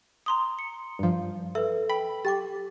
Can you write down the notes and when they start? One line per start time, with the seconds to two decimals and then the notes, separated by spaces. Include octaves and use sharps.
0.26 A#5 C6 D#6
0.59 C#7
0.99 G2 F3
1.55 A4 B4 E5
1.89 G5 B5
2.25 G4 G5 D6 A6